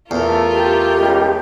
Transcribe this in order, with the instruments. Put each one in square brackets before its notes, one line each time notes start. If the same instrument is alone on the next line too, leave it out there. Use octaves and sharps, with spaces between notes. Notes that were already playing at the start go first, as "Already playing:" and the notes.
[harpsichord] E2 [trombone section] A3 [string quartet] F4 A#4
[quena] G4
[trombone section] C#2 A2